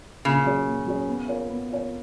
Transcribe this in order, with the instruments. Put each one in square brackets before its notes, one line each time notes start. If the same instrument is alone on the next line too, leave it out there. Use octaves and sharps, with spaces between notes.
[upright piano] A#2 [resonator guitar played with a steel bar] C#3
[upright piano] F#3 C#4 G#4 C#5
A#2
F#3 C#4 G#4 C#5
B3
F4 A#4 C#5
B3
F4 A#4 C#5